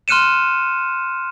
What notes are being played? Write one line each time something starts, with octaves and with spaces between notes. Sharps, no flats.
C6 F6 F#6 C#7 D#7 E7